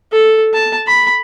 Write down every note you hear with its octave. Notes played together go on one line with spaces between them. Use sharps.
A4
A5
B5